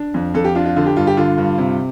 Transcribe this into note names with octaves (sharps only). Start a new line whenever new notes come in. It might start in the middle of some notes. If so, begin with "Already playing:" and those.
Already playing: D4
F2
F2 A4
G4
D4 F4
F4
D3 F4
G4
G2 F4
G4
D3 F4
G2
C3